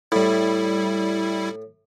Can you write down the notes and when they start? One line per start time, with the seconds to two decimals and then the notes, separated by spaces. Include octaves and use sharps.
0.12 A2 G3 E4